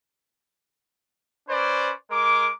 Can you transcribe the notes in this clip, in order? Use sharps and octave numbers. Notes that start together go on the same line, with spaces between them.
C#4 B4 C5 D5
G#3 A#4 D6